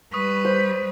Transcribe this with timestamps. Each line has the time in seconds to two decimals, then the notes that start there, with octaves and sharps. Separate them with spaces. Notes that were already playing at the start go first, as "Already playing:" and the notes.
0.13 G3 B4 C#6 D#6
0.45 C5